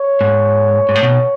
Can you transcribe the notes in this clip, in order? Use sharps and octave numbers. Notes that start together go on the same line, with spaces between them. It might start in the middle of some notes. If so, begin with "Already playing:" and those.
Already playing: C#5
G#2
G#2
A2
B2